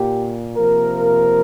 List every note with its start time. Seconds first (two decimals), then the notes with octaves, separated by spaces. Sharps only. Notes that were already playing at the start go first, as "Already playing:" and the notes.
Already playing: A#2 A#3 G4
0.56 C3 F3 A#3 A#4